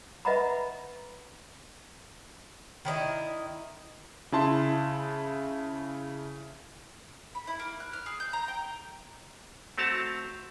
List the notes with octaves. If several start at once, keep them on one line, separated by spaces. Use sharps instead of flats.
B4 D#5 E5 F#5 A#5 B5
D#3 E4 D5 D#5
C#3 E4 A5 C6
B5
E4
A#3
F#6
F6
G#4
G6
A#5
G5
A3 C4 F#4 A5 A#5